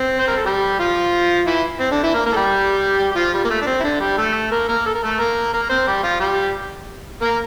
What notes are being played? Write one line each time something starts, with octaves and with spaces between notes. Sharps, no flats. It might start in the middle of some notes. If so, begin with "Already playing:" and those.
Already playing: C4
C5
A#4
A4
G3 G4
F3 F4
E3 E4
C4
D3 D4
E3 E4
A#3 A#4
A#3 A#4
A4
G3 G4
G4
F3 F4
G3
A#3
A3
D4
C4
E4
D3 D4
G3 G4
A3 A4
A#3 A#4
A#3 A#4
A4
A#4
A3 A4
A#3 A#4
A#3 A#4
C4 C5
G3 G4
F3 F4
G3 G4
A#3 A#4